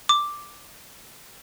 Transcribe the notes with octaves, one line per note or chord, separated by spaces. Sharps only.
D6